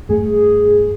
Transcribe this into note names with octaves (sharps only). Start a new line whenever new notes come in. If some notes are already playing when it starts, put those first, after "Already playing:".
G2 A3 G#4